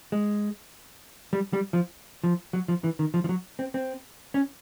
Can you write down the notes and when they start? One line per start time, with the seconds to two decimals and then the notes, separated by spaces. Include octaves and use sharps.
0.12 G#3
1.33 G3
1.53 G3
1.73 F3
2.24 F3
2.53 F#3
2.68 F3
2.84 E3
2.99 D#3
3.14 F3
3.24 F3
3.29 F#3
3.59 C4
3.74 C4
4.34 C#4